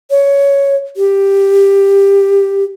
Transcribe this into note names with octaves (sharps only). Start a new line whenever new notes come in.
C#5
G4